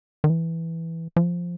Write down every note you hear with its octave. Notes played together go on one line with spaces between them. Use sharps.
D#3
E3
F3